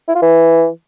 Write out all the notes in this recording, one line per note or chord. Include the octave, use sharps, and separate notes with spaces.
E4
F4
E3